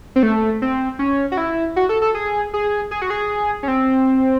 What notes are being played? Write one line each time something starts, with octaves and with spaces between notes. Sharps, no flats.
C4
A3
C4
C#4
F#4
E4
F#4
A4
A4
G#4
G#4
G#4
F#4
G#4
C#4
C4